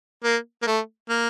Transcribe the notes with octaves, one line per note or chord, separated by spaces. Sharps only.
A#3
A#3
A3
A#3